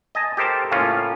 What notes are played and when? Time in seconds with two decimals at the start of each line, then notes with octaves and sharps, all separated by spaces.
0.15 D#5 G#5 A5
0.37 G4 A4 A#4 C5 A5
0.72 A2 C#3 A#3 C#4 F4